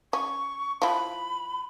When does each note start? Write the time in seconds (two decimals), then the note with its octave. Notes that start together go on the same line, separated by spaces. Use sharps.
0.13 C#4 C#6
0.82 F3 E4 B5